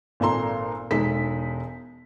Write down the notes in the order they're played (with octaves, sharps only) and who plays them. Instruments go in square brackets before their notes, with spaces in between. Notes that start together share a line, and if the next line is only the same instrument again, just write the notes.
[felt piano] G#1 A#2 A4 A#5 C6
E1 G#3 D#4 A4 B6